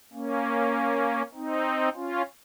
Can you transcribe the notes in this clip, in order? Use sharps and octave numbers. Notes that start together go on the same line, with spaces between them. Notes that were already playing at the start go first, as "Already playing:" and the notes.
A#3 C#4
C4 D#4
C#4 F4